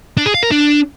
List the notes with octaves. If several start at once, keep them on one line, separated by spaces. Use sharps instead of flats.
D4
G#4
F5
A#4
D4